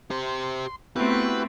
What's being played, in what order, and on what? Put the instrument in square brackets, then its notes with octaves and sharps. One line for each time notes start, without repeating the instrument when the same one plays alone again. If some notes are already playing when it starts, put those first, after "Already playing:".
[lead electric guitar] G4 C5 [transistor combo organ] C6
[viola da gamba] A3 C4 [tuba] B3 [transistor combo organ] E4 F#4 G4 [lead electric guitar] B4